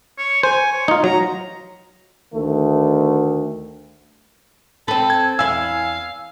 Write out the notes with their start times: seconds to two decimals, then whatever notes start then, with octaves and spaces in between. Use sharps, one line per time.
0.18 C#5
0.43 C5 G#5
0.72 C#5
0.88 D#4 F4
1.04 F#3 A#5
2.34 D2 D#3 A3
4.88 C4 A4 B4
5.10 G#6
5.39 E2 E4 F5 G#5 E6